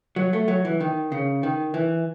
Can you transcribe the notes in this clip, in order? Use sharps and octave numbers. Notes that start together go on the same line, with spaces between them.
F#3
A3
F#3
E3
D#3
C#3
D#3
E3